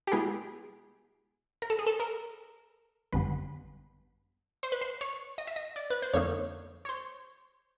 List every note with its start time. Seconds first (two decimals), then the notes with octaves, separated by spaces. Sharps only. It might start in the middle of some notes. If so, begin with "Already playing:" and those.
0.07 G4
0.12 B2 G#3 B3 E4 G#4
1.62 A#4
1.70 A4
1.79 G#4
1.86 A4
2.00 A#4
3.13 G#1 F#2 D3 G3 B3 B4
4.63 C5
4.72 B4
4.81 C5
5.01 C#5
5.38 D#5
5.47 E5
5.56 D#5
5.76 D5
5.90 B4
6.02 C5
6.13 F2 D3 F3 A#3 D#4 C#5
6.85 C#5
6.89 C5